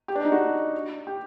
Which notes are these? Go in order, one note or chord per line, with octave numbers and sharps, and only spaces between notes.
G4
D4
D#4
F#4
G4